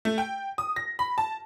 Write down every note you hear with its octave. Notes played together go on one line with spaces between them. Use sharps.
A3
G5
D#6
A#6
B5
A5